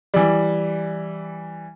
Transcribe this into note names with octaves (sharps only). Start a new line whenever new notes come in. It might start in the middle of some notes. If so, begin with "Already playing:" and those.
E3 G3